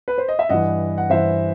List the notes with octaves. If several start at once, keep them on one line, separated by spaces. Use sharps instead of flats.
B4
C5
D#5
E5
G2 E3 D#5 F#5
F#5
G2 E3 C5 E5